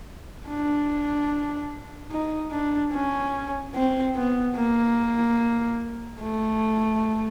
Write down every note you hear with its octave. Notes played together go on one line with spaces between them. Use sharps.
D4
D#4
D4
C#4
C4
B3
A#3
A3